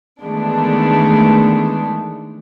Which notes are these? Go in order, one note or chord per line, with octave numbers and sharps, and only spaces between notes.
D#3 E3 G#3 A3 B3 D4